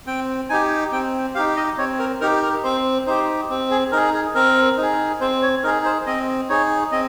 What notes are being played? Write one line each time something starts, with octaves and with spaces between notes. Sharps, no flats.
C4 G5
D#4 G4 G#5
C4 G5
D#4 G4 F5
D#5
C4 C#5
A#4
D#4 G4 A#4
A#4
C4 C5
D#4 G4 C5
C4
G#4
D#4 G#4 A#4
G#4
C4 A#4
D#4 G#4
C4 C5
C#5
D#4 G#4 A#4
C5
C4 D#5
D#4 G#4 C#5
C4 D#5